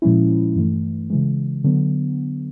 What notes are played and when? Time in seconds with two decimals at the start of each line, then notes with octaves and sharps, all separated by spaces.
0.02 A#2 F3 G#3 C#4 E4
0.56 G2 E3 A3
1.10 C#3 E3 G#3
1.64 D3 F#3 B3